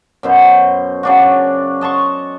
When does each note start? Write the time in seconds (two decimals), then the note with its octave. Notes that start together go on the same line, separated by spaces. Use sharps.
0.23 F#2 B2 C5
1.03 C#3 D4 F#4
1.81 D#5 A5 C6 C#6